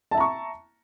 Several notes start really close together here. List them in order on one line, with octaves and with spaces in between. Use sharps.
A5 E5 A#5 C#6